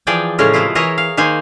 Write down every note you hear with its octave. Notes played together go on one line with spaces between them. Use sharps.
E3 F3 G#4 D5 G5 G#5
A2 C#3 G#3 C#4 A#4
C3 F3 G#3 E4 F4
E3 E4 G#4 A#4 C#5 D#5
F5
D#3 A#3 C5 G#5